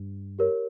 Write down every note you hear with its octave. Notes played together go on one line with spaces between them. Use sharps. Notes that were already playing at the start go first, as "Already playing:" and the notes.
Already playing: G2
G4 A#4 C#5